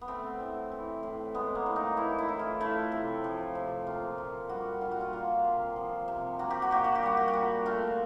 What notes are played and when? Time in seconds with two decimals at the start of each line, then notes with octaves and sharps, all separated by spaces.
0.01 B3
0.08 A3 C4
0.40 A2
0.72 E3
1.03 A2
1.34 G#3 B3
1.55 A#3
1.66 A2
1.76 D#4
1.97 E3 E4
2.18 E4
2.29 A2
2.39 F4
2.60 A3 E4
2.92 C3
3.24 F3
3.55 C3
3.87 A#3 F4
4.18 A#2
4.49 G3 F#4
4.81 A#2 F4
4.91 F#4
5.01 F4
5.13 A#3 F4
5.44 C3
5.76 F3
6.08 C3
6.39 A#3 F#4
6.50 G4
6.62 F#4
6.71 A#2 G4
6.84 F#4
6.95 G4
7.03 G3 F#4
7.17 G4
7.28 F#4
7.33 A#2
7.66 A3 F4